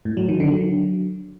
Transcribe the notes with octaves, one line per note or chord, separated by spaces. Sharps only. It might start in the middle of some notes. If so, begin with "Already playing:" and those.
A2
F#3
D#3
D3
F#3